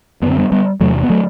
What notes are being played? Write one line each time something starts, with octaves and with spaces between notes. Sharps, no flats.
F#2 D3 B3 C4
G3 B3
G3 B3
E2 C3 F#3 A3
B3
F#3 A3